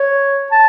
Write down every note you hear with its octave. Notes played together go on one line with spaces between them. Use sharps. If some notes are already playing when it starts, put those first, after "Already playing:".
Already playing: C#5
A5